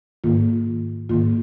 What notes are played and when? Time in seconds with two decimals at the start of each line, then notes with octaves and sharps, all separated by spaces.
0.24 G#2 D#3 A#3 F4
1.09 G#2 D#3 A#3 F4